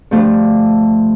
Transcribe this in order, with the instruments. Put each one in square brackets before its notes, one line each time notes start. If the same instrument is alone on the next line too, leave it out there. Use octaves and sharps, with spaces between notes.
[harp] G2 D3 F3 A3 D4